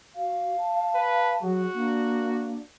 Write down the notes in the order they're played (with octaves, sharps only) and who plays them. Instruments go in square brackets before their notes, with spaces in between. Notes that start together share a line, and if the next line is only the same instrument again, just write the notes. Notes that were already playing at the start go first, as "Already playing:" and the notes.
[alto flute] F#4 [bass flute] F5
[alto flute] A5
[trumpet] B4
[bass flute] F#3 [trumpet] F#4 [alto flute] G#4
[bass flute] A#3 [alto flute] D4